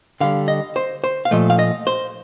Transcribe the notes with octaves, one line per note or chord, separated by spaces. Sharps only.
D3 G3 F5
D#5
C5
C5
F5
A#2 F3 A3 D#5
F5
D#5
C5